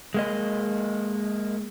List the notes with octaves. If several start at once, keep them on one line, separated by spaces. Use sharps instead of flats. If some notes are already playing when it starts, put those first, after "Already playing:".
G#3 A#3 D#5